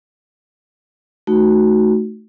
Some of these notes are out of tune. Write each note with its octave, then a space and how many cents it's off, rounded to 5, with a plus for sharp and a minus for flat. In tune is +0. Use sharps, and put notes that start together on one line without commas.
A3 -10 D#4 +0 F#4 +0